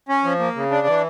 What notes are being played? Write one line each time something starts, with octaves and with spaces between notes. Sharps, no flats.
C#4
F3
A#3
C#3
D4
E3